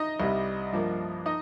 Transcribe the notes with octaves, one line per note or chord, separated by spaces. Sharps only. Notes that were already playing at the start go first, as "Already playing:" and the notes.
Already playing: D#4 D#5
C2 C3 G3
G2 F3 A#3
D#4 D#5